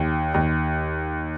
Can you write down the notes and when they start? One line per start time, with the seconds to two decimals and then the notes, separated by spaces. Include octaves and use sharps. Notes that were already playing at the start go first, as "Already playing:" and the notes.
Already playing: D#2
0.34 D#2